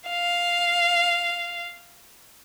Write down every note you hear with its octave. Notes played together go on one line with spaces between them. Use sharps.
F5